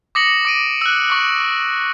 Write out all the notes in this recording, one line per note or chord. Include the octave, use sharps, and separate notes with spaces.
D6 D#6 A#6 C#7 F#7
D6 D7 D#7
E6 F#6
C#6 D6